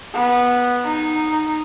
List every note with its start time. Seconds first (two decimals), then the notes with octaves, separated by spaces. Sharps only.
0.14 B3
0.84 D#4